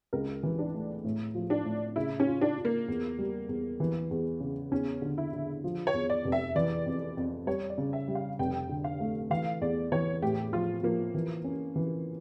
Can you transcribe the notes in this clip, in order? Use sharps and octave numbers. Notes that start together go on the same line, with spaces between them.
C#2 A#4
E3
D4
A3
A2
F3
D4
A2
C#3 E4
C#4
F4
D4
F4
A#3
E2
G3
E2
E3
E2
C#3
E2 C#4
D3
E4
D3
F3
C#5
E2
D5
F1
E5
E3 D5
F2
F2
G3 C#5
D5
C#3
E5
G3
F5
F1 G5
D3
F5
A3
E3 F5
E2 D5
E3 C#5
A2 G4
F3 F4
F3 A#3
E3
C#4
E3